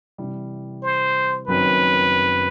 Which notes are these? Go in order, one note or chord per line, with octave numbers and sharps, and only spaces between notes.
C3 E3 G3
C5
F#1 F#2 D#3 F#3 C4 B4